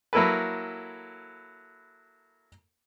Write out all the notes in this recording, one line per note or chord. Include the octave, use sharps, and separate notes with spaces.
F#3 A#3 E4 A4 B4